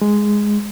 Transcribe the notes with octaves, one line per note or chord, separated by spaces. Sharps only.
G#3